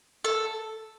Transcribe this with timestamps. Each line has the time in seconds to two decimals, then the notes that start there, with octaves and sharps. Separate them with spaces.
0.24 A4